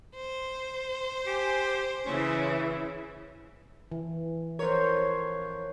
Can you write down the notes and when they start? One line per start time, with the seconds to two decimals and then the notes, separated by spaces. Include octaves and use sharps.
0.15 C5
1.27 G4 G#5
2.06 C#3 E3 C#4 E4
3.92 E3
4.59 F2 A2 A#4 C5 C#5